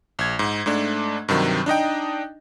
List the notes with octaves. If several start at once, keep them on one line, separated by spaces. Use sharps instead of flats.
A#1 G#6
G#2
G#2 A3 D4
G2 C3 D#3 F#3
D4 D#4 D#5 G5